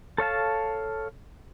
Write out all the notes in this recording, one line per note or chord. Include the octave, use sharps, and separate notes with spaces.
A4 C#5 F5 A5